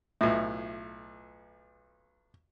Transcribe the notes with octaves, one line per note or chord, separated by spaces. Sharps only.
B1 A2 F4 E5